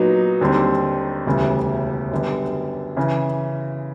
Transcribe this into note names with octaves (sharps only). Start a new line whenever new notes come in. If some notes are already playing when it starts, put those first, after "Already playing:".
Already playing: A#2 F#3 B3 D#4
D#2 D3 G3 C4 D#4
E1 D2 C#3 E3 G3
F#2 D3 G3 B3
C#3 E3